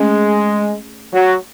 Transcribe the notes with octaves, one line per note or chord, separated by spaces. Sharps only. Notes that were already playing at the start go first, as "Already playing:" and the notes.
Already playing: G#3 A3 C#4 G#4 D#5
F#3